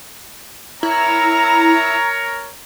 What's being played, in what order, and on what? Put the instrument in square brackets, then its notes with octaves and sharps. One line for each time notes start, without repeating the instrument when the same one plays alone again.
[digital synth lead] E4 [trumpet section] A#4 C#5 [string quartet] A#5